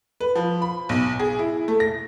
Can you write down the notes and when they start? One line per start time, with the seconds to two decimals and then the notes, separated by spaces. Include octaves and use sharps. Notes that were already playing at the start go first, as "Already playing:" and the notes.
0.21 B4
0.35 F3
0.62 B5
0.89 B1
1.20 G#4
1.39 E4
1.68 A3
1.80 A#6